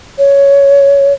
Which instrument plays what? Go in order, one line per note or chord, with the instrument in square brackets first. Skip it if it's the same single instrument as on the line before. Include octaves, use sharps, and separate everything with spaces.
[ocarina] C#5